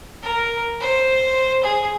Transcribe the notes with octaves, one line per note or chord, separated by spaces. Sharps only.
A#4
C5
G#4